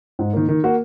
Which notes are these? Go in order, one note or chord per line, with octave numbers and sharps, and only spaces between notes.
G#2
D#3 A#3
D#3
A#3 F#4